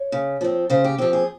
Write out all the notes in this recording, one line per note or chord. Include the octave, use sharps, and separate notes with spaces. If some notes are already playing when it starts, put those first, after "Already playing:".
Already playing: C#5
C#3
F3 C4
C#3 C5
G4
F3 C4 G4
G#4